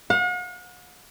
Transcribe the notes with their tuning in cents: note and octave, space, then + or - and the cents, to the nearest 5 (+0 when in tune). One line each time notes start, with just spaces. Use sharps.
F#5 -45